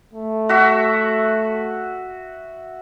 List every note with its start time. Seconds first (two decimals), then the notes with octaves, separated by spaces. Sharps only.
0.13 A3
0.49 F#4 E5